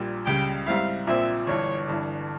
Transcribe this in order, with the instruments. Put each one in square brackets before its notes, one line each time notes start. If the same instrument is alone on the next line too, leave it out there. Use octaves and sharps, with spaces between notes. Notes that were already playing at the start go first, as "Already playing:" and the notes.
Already playing: [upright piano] A#1 A#2 G3
[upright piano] C#2 C#3 G3 [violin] G5
[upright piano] G#2 G3 C4 E4 [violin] F5
[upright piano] A#1 A#2 F3 C4 [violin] E5
[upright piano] G1 G2 E3 [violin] C#5
[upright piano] G1 G2 E3